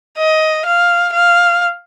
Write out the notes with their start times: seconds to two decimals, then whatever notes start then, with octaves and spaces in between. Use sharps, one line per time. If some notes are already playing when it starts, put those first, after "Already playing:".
0.17 D#5
0.66 F5
1.13 F5